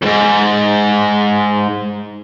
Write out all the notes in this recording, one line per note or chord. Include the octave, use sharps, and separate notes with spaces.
F2 G#2